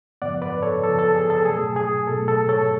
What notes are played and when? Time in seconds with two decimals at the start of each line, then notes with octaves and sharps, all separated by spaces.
0.22 F#2 C#3 F3 B3 D5 F#5
0.42 B4 D5
0.62 A4 C#5
0.83 F#2 C#3 F3 B3 A4
0.99 A4
1.15 G#4
1.30 A4
1.45 B2 F#3 A3 G#4
1.76 G#4
2.07 B2 F#3 A3 A4
2.28 A4
2.49 A4 C#5